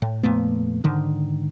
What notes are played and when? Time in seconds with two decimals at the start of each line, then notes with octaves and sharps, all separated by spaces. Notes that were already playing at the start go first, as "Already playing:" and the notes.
0.02 A2
0.23 F2 A#2 A3 B3
0.84 G#2 D3 D#3